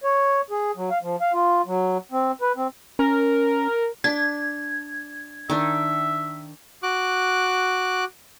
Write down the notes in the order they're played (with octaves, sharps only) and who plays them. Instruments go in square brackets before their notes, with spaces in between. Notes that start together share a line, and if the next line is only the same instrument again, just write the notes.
[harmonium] C#5
G#4
F#3
F5
F3
F5
F4
F#3
C4
B4
C4
[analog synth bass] C#4 [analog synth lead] A#4
[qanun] D4 [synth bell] G#6
[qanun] D#3 D4 [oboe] E5
[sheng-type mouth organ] F#4 D6 F#6